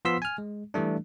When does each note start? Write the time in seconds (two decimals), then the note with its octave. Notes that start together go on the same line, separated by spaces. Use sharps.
0.05 F3 B3 F4 C6 E6 B6
0.22 G#5 F6
0.38 G#3
0.74 E3 G3 A3 D4